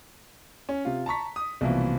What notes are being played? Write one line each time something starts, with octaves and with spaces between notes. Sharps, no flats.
C#4
C3 F4
A5 A#5 C#6 B6
D#6
C2 B2 E3 F3 A#3